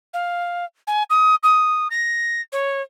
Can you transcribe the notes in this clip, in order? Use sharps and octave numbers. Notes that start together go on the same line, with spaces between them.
F5
G#5
D#6
D#6
A#6
C#5